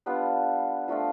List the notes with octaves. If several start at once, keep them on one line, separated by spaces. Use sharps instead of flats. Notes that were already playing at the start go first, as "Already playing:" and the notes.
G3 B3 D4 F4
F3 A3 D4 F4